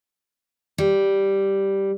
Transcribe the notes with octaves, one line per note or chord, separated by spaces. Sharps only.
G3